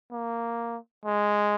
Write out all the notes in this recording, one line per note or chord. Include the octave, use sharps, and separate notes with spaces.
A#3
G#3